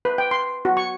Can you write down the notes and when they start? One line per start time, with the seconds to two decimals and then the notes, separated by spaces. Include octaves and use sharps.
0.05 B4
0.18 G5
0.31 C6
0.65 F#4
0.77 C#6